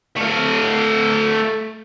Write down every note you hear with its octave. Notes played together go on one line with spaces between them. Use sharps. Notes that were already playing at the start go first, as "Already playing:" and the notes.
A3 F5